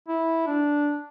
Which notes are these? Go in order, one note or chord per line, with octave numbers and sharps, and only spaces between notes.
E4
D4